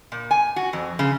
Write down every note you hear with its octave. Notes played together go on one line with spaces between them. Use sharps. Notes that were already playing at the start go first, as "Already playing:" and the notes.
A#2
G#5
F#4
F2
C#3